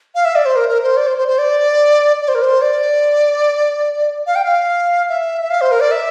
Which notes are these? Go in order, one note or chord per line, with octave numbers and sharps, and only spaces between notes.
F5
E5
D5
C5
A#4
A#4
C5
D5
C5
C5
C5
D5
D5
C5
A#4
C5
D5
F5
G5
F5
E5
E5
F5
C5
A#4
D5
E5